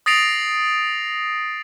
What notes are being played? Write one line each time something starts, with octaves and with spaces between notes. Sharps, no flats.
D#6 A6 A#6 C7 D7 F7